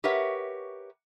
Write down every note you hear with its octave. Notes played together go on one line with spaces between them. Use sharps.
G4 A#4 B4 C#5 E5 F#5